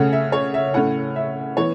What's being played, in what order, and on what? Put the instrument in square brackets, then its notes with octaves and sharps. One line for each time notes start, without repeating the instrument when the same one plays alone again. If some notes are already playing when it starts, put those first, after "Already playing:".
Already playing: [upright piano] C#3 A3 C#4 F#5
E5
C#5
E5
A2 A3 C#4 F#5
E5
E3 B3 C#5